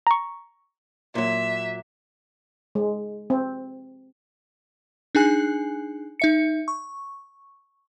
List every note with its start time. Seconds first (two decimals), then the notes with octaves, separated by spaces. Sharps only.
0.07 A#5 C#6
1.15 A#2 F#3 E5
2.75 G#3
3.30 C4
5.15 D4 D#4 G#4 G#5 F#6
6.20 D#4 E5 C#7
6.68 C#6